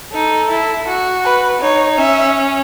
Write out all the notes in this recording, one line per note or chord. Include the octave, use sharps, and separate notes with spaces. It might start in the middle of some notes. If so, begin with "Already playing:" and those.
D#4 A4
E4
F#4
B4
D#4 C#5
C#4 E5